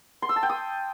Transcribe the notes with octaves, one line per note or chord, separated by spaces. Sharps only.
C6
E6
A5
G5
D#6